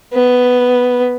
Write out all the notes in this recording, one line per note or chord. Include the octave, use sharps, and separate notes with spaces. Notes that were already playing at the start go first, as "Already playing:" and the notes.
B3